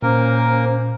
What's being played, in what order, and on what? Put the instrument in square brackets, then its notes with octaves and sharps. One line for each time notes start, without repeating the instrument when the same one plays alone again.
[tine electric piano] A#2 [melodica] A#3 A#4 [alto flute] C#4 [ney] C5